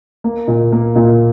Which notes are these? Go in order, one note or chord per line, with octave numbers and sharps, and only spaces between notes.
A#3
A#2
A#3
A#2